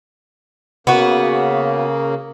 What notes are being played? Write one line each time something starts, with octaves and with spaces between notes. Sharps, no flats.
C#3 A#3 B3 F#4